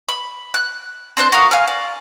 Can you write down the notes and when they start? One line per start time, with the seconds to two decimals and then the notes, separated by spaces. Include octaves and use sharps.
0.09 B5
0.54 F#6
1.17 C4 D4 C5 F#6
1.32 F#4 A#4 F5 D#6
1.51 F5 G#5 F6
1.68 D5